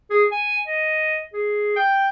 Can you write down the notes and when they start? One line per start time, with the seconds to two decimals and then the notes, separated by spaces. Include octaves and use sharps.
0.10 G#4
0.32 G#5
0.67 D#5
1.34 G#4
1.76 G5